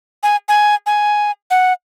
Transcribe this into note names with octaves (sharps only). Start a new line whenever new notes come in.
G#5
G#5
G#5
F#5